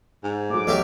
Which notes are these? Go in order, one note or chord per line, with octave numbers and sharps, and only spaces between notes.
G#2
A2 F#3 D6
B1 F#3 A3 G4